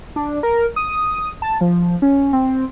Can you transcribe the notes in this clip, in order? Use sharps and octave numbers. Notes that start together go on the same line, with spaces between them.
D4
A#4
D#6
A5
F3
C#4
C4